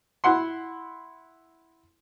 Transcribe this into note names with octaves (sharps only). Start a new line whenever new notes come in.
E4 F#5 C6